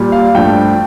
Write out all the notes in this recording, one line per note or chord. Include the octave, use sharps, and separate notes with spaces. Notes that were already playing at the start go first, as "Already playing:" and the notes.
Already playing: A#2 G3
F5
G2 F3 A3 G5